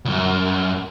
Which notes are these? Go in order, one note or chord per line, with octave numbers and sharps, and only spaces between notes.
C#2 F#2